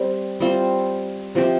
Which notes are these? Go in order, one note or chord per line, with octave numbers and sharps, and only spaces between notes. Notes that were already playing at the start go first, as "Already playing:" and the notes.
Already playing: G3 C4
G3 C4 F4
C3 F3 C4 G4